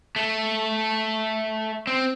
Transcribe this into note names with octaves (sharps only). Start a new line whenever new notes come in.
A3
C4